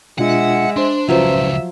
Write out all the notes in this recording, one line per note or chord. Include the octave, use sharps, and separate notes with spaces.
B2 G#3 D4 F4 E5 F#5
D4 C5 C6
C#2 F3 F#3 C#4 E4 B4 C5 E5